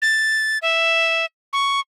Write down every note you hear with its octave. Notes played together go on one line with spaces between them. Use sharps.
A6
E5
C#6